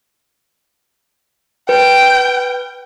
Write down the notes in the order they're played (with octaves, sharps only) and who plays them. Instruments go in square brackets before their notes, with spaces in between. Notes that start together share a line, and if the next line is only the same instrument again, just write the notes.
[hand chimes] B4 [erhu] G5